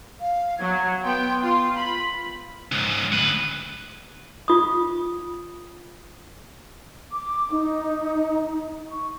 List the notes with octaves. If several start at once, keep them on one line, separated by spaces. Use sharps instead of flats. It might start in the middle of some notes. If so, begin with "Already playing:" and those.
F5
F#3 G#6
B3 G5 C6
F4 C6
B5
C#2 G#2
D2 B4
F4 D#6
D6
D#4
C#6